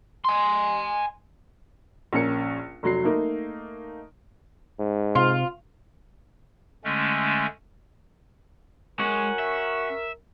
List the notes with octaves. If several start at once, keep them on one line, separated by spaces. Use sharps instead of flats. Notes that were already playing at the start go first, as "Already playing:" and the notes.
G#5 C6
A#1 C#4 A#4 C#7
F1 F#3 C7
A3 A#3 D#4
G#2
C3 F4
D3 G#3 A3 C#4
G#3 C#4 F#4 A#4
E5